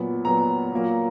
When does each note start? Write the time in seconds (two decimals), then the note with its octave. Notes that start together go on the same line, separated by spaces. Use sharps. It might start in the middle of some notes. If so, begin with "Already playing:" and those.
Already playing: A#2 F#3 B3
0.25 A#2 F#3 B3 A#5
0.72 A#2 F#3 A#3